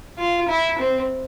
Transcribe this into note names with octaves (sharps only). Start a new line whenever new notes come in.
F4
E4
C4